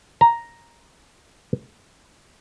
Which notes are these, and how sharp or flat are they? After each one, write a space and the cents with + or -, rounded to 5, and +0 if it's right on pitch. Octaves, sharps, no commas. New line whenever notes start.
A#5 +5